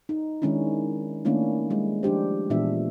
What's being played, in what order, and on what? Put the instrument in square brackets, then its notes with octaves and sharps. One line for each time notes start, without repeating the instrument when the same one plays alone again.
[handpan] D#4
D#3 G#3 C#4 D4 E4
D#3 A3 A#3 C#4 D4 E4
G3 G#3 E4
F3 D4 G4 C5
A#2 E3 G#3 B3 D4 E5